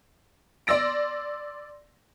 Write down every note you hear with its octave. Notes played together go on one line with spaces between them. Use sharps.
D5 C6 E6 A#6 D7